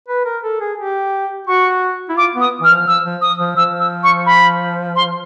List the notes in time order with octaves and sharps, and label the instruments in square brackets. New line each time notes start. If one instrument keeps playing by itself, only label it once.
[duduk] B4
A#4
A4
G#4
G4
[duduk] F#4 [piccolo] C#6
[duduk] E4
[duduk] F4 [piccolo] D6
[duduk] B3
[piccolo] D#6
[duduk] E3 [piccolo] F6
[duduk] F3
[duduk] F3 [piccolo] E6
[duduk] F3
[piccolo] D#6
[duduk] F3
[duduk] F3 [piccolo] E6
[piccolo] E6
C#6
B5
C6